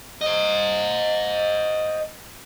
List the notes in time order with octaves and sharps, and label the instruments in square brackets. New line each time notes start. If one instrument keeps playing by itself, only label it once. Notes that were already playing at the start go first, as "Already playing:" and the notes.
[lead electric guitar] C5 D#5